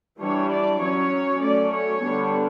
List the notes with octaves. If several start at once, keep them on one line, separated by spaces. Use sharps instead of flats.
E3 G3 D4 C#5
D5
F#3 C#4 C#5
F#3 A3 C#4 D5
C#5
D3 G3 B3 D4